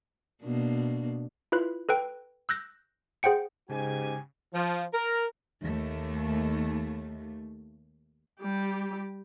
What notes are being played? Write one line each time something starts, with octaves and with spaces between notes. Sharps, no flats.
B2 A#3 D4
E4 F4 B4 F#6
A4 B4 G5
E6 F#6 G6 A#6
G#4 C5 F#5 G5 C#7
G#2 C#3 G4 G#5
F3
A#4
D#2 A3
G3 G4